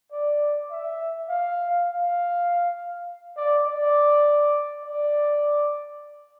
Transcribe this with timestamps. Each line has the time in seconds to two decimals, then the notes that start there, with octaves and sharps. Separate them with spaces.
0.11 D5
0.70 E5
1.29 F5
1.89 F5
3.36 D5
3.67 D5
4.84 D5